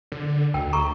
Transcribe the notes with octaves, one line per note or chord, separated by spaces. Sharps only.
D3
D2 A#4 G5
A4 A#5 C#6